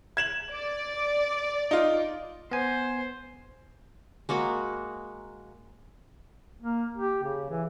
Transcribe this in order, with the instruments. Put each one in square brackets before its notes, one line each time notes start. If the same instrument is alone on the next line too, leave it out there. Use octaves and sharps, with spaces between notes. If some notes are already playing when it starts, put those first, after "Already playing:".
[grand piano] G#6 E7 F#7
[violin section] D5
[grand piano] D#4 F4
[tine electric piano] B3 G#5 [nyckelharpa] C5
[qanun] G#3 A#3 F#4 B5
[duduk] A#3
G4
C#3
E3